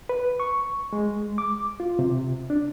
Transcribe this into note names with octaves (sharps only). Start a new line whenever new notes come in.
B4
C#6
G#3
D6
F4
C3
D4